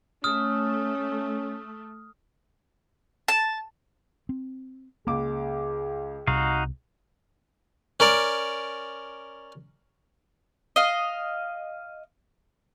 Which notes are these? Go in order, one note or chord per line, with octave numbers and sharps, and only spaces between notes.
A3 C#4 D#6 F6
A5
C4
C#2 A#3 G#4 D6
C2 C3 D#4 F#4 F5
C#4 A#4 D5
D#5 F5